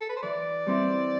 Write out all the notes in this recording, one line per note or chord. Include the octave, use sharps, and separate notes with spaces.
A4
B4
C5
E3 D5
G3 C4 E4